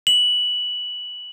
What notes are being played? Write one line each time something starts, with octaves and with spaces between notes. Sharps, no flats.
F#7